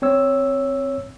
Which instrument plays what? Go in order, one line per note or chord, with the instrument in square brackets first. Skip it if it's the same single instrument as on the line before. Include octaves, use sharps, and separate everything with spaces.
[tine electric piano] C4 C#5 E6